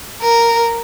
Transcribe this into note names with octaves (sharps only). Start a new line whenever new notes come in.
A#4